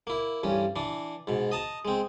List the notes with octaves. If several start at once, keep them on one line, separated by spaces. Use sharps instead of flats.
A#3 E4
A1 G2 C#4
E3 D4
G#2 B2
D#5 A5 A#5
G#3 C4